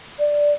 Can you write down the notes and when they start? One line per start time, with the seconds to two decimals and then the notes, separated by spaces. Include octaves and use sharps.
0.19 D5